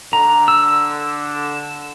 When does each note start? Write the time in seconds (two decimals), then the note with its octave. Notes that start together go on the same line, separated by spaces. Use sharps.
0.13 D3 A#5
0.48 E6